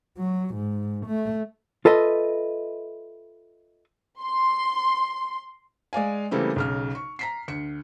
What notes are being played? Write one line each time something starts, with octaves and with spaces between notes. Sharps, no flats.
F#3
G#2
A3
F4 A4 B4 D#5 E5
C6
G#3 D5 F5 G#5
C#3 E3 G3 A3 A#3 C4
B1 C#3 F6
C#6
A#5 B6 C7
D2 C#7